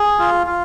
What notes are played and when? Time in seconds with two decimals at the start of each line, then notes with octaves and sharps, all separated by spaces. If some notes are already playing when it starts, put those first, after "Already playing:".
Already playing: G#4
0.19 F4
0.47 F4